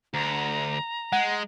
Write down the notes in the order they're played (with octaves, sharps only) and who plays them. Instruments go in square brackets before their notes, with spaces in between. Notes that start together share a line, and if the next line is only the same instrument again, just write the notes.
[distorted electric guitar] D2 [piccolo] A#5
[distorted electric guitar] G#3 [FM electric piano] F#5